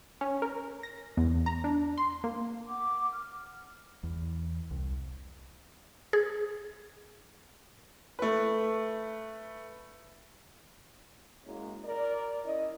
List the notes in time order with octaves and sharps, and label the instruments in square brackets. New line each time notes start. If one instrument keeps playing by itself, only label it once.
[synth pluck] C#4
A#4
A#6
E2
A#5
D4
C6
A#3
[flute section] F#5 D6
F6
[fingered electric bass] E2
C2
[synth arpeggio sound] G#4
[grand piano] A3 B4
[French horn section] G#3 A#3 C#4 E4 F#4
A#4 D5
C#4 E4 D#5